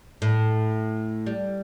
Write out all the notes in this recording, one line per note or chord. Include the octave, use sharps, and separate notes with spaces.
A2
G3